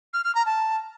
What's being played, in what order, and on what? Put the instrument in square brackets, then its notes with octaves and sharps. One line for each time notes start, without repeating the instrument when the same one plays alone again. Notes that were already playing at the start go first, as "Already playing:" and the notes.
[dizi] F6
F6
A#5
A5